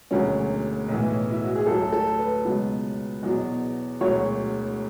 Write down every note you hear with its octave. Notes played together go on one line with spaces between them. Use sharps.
E1 D2 D3 F#3 C#4
B1 A2 E3
E4
F#4
G#4
D2 D3 F#3 A4
A4
B4
C#2 B2 F#3
E2 B2 F#3
E1 D2 D3 F#3 C#5